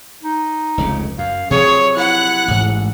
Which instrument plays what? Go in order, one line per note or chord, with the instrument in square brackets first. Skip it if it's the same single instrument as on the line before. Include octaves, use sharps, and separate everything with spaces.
[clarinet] D#4
[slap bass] F1 C#2 C#3
[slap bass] F#2 [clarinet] F5
[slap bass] C3 F3 F#3 [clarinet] G#4 [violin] C#5
[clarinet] E4 [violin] F#5 F#6
[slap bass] A1 G#2